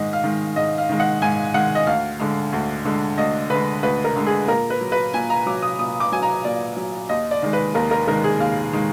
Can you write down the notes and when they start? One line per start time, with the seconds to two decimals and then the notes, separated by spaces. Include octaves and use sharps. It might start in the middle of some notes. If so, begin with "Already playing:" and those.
Already playing: G#2 D#3 G#3 D#5
0.13 F5
0.24 D#3 G#3
0.56 G#2 D#5
0.78 F5
0.89 D#3 G#3
1.00 F#5
1.22 G#2 G#5
1.54 D#3 G#3 F#5
1.75 D#5
1.87 D2 F5
2.20 D3 G#3
2.53 D2
2.85 D3 G#3
3.18 D2 D#5
3.50 D3 G#3 B4
3.83 D2 B4
4.04 A#4
4.16 D3 G#3
4.26 G#4
4.48 A#2 A#4
4.70 B4
4.81 F#3
4.92 B4
5.14 A#2 G#5
5.30 A#5
5.46 F#3 D6
5.62 D#6
5.79 A#2 D#6
6.00 D6
6.12 F#3 G#5
6.23 A#5
6.44 A#2 D5
6.77 F#3
7.09 D#2 D#5
7.31 D5
7.42 D#3 G#3
7.53 B4
7.75 D#2 A#4
7.91 A#4
8.08 D#3 G#3 A#4
8.24 G#4
8.40 D#2 F5
8.73 D#3 G#3